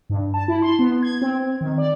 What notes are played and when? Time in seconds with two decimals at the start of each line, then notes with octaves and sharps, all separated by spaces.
0.10 G2
0.34 A5
0.48 E4
0.62 C6
0.79 B3
1.03 G#6
1.22 C4
1.61 D#3
1.78 D5